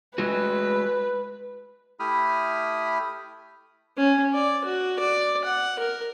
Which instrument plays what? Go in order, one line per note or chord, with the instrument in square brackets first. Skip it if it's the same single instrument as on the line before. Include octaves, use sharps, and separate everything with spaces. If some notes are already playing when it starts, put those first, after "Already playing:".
[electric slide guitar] G#3 A3 F#4 [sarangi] B4
[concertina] A3 E4 G4 B5 D#6 F6
[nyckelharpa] C#4
D5
F#4
D5
F#5
A#4